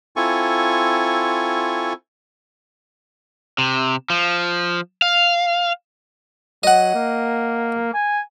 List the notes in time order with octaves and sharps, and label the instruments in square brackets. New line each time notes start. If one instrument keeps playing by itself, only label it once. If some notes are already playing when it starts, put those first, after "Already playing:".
[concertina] C4 E4 F4 A4 G#5 C#6
[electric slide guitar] C3
F3
F5
[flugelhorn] F#3 [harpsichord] D#5 F#5
[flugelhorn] A#3
G#5